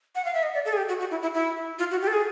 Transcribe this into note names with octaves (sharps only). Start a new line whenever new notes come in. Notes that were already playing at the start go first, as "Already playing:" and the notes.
F#5
F5
E5
D#5
D5
A4
G#4
G4
F#4
F#4
E4
E4
E4
F4
F#4
G4
A4
G#4